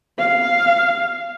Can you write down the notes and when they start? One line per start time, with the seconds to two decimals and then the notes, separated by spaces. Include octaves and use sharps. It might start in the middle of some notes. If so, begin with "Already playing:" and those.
0.18 F5